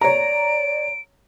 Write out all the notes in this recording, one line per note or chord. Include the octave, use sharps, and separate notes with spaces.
C#5 D5 A#5 D7